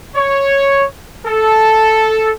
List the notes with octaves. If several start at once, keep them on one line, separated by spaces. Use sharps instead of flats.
C#5
A4